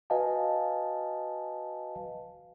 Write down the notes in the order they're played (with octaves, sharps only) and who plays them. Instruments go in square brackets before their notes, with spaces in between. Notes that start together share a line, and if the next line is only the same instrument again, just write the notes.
[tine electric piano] F#4 B4 D#5 F5 G#5 A5